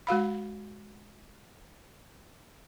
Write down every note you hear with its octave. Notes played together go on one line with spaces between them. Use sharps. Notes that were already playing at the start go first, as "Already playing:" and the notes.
G#3 F#4 F5 B5